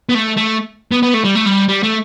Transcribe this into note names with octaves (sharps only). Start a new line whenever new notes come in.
B3
A3
A3
B3
B3
A3
G3
A3
G3
G3
A3